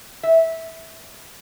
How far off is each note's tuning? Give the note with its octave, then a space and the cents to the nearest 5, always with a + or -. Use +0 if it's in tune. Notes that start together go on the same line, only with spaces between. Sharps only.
E5 -15